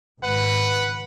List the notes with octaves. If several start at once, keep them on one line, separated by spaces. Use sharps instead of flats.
G#1 G#2 C#3 B4 F#5